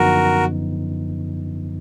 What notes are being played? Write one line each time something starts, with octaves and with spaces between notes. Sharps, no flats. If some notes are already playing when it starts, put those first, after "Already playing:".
Already playing: F#2 D3 F3 B3 D#4 F#4 A#4